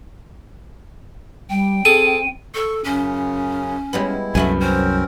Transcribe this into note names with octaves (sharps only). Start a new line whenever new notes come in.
G3 G5
C4 G#4 A4 D#7
A4 C#6
F#2 C#3 C#4
G3 G#3 B3 E4
C2 F#2 A3 B3 F#4 E5 G#5
C4 C#4 A#4 C5